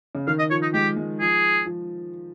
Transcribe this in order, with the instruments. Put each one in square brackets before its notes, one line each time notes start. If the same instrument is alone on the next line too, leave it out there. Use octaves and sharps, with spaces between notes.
[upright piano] C#3
[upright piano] D#3 [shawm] F5
[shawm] D#5
[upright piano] F3 [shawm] C#5
[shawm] D#4
[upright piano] G#3 [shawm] G4
[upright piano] G#3
[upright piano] F3 [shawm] G#4
[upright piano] F3